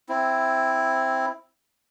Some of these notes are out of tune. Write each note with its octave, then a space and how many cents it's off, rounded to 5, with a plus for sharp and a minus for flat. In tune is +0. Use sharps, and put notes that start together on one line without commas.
C4 +0 E4 +0